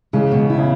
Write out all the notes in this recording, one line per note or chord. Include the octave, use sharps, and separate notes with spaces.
C#3 E3 G#3
B2
E4
C#3